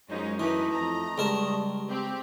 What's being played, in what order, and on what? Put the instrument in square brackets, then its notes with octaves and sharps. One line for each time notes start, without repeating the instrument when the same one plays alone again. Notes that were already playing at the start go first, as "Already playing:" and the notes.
[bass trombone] F#2 [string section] G#3 C#4 D#4 [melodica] F4 C5
[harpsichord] E3 [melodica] A3 D#5 [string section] D#4 A#4 B4
[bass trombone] F2 [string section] A#5
[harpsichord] C#2 A#4 A5 [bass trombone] G3
[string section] C4 G4